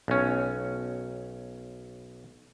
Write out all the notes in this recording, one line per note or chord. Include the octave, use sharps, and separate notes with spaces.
B1 C#4